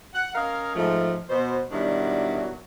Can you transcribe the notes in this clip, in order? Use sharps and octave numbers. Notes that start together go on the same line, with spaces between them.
F#5
C#4 A#4 D#5 F5
G#2 F3 A3
B2 C5
B2 D#3 F#3 G3 D4 E4